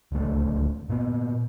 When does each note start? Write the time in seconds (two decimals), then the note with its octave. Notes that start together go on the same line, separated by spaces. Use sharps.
0.12 D1 C#2 A3
0.89 A#2 B3